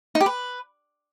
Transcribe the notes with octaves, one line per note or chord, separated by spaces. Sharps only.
D#4
G4
B4